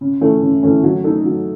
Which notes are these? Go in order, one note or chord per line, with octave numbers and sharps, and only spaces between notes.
C#3
E3 A3 C#4
C#3
E3 A3 C#4
F#3
A3 D#4 A4
F#3